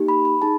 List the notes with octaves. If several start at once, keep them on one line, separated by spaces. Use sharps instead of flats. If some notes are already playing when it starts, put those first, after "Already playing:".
Already playing: A#3 D#4 G4
B5
B5
D#4 G#4 A5